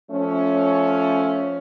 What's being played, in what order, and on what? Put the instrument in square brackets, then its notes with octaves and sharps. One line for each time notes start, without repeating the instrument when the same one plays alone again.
[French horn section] F3 A3 C#4